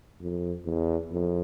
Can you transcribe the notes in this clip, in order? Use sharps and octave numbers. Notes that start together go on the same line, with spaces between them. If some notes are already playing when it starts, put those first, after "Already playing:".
F2
E2
F2